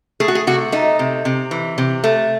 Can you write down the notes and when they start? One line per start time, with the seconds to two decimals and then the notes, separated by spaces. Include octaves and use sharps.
0.20 A3 G#4
0.28 F#4
0.35 G#4
0.47 C3 F#4
0.72 A3 D#4
0.99 C3
1.25 C3
1.51 E3
1.78 C3
2.04 A3